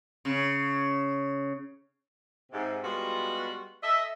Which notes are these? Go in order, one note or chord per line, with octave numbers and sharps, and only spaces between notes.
C#3
G#2 C3
G3 G#3 B3 F4 F#4
A4 D#5 E5